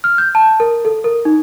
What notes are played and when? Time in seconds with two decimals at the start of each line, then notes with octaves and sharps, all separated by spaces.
0.04 F6
0.18 G6
0.35 A5
0.60 A#4
0.85 A4
1.04 A#4
1.25 D#4